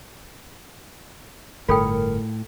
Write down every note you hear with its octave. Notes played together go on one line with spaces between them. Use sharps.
G1 A2 F4 A4 A#4 G5